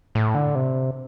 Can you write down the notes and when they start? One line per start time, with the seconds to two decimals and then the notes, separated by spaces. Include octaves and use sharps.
0.15 A2
0.35 D3
0.55 C3